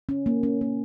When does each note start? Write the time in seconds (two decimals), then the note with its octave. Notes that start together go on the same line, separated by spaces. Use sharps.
0.09 C#4
0.26 A#3
0.43 C#4
0.61 A#3